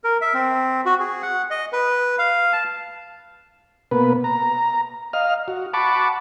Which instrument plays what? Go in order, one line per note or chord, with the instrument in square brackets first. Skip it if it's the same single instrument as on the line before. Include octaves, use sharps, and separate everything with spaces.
[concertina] A#4
E5
C4
F#4
G#4
F#5
D#5
B4
F5
A5
[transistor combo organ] B2 A#3 B3 B4
A#5
D#5 F5 F6
F#4
F#5 A5 B5 C#6 D6